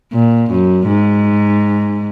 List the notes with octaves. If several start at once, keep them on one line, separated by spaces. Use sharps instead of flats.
A#2
F#2
G#2